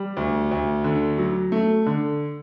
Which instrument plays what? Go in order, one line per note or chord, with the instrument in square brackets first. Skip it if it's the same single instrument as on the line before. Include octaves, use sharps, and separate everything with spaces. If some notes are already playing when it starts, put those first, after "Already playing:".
Already playing: [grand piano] G3
D2
D2
D3
F#3
A3
D3